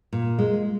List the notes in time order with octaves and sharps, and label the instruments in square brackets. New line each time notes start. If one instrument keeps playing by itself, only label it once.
[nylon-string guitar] A#2
G#3